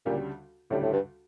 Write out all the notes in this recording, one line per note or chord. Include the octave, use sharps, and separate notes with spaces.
D2 A#2 C#3 G3 D4 G4
D2 A2 C#3 G3 D4 G4
A2
G2